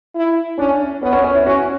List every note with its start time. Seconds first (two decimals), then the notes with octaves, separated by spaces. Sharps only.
0.15 E4
0.58 C#4 D4
1.02 B3 C#4
1.13 C#4
1.24 C#4
1.35 E4
1.46 C#4 F#4